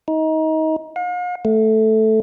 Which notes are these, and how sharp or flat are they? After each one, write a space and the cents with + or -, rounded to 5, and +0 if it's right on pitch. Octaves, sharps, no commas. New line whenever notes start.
D#4 +25
F5 +45
A3 -5